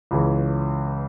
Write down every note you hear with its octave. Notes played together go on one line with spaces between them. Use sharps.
C#2 C#3 E3